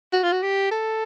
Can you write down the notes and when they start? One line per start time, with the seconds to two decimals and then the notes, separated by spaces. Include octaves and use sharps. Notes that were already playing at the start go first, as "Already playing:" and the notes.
0.13 F#4
0.23 F4
0.33 F#4
0.43 G4
0.71 A4